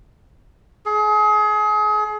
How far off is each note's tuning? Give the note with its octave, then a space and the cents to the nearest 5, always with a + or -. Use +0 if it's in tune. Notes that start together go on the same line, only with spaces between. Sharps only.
G#4 +30